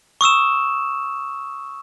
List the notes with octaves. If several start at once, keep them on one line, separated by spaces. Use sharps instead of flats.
C#6 D#6 E6 E7